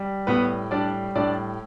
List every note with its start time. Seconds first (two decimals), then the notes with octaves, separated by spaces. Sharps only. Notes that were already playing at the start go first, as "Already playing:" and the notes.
Already playing: G3
0.27 A2 B3 B4
0.71 G3 D4 D5
1.15 A2 D4 D5